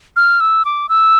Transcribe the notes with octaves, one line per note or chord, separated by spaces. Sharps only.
F6
E6
D6
E6